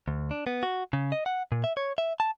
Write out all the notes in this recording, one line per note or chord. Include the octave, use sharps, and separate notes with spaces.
D2
D4
B3
F#4
C#3
D#5
F#5
A#2
E5
C#5
E5
A5